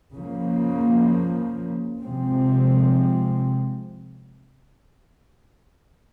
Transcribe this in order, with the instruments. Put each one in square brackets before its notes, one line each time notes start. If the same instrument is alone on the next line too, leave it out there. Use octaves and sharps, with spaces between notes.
[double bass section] C#3 F3 A#3
C3 F3 G#3 C4